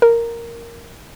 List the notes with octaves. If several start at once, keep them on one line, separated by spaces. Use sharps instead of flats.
A#4